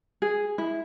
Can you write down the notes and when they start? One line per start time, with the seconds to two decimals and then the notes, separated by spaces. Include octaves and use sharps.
0.22 G#4
0.58 E4